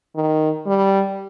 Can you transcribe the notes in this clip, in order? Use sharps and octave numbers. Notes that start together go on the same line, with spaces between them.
D#3
G3